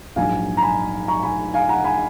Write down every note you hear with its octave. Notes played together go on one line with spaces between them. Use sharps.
A#1 G#2 F#3 F5 G#5
A#5
G#5 B5
A#5 C#6
G#5 B5
F5 G#5
F#5 A#5
G#5 B5